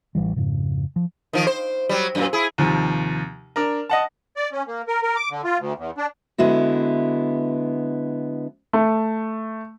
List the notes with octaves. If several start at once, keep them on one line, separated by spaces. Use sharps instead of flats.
A1 A#2 E3 G3
F2 G#2 C#3
F3
D#3 F3
C5
F#3 G3
F#2 A#2
E4 G#4
D#2 C3 F3
D4 A#4
D#5 F#5 A5
D5
C#4
A#3
A#4
A#4
D6
D3
F4
D2
E2
D4
D3 G#3 B3 E4 F#4
A3